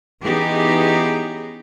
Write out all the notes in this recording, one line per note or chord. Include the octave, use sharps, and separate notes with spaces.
E3 B3 C#4 D#4 G4 G#4